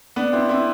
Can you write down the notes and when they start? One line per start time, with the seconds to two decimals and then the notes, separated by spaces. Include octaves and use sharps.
0.16 B3 D4
0.33 C4 E4
0.49 C4 E4